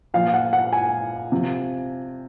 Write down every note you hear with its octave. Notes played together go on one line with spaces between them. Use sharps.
A#2 F3 F5
F#5
F#5
G#5
C3 F3